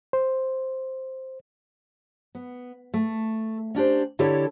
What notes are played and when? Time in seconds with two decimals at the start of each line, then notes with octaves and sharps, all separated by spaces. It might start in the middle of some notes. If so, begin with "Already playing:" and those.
0.13 C5
2.35 B3
2.94 A3
3.75 C#4 D4 G4 C5
4.19 D3 E4 G4 A4 C#5